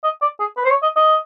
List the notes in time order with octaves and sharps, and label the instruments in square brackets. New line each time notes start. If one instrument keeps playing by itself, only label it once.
[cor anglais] D#5
D5
G#4
B4
C5
C#5
D#5
D#5